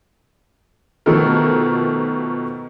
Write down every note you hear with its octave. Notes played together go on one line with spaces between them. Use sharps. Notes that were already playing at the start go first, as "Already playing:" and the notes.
B2 D#3 F3 A3 A4 A#4